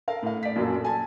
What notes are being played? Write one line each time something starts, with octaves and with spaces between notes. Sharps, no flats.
A4 A#4 F5
A2 F5
D5 B6
A#1 F#2 A4
G#5 A5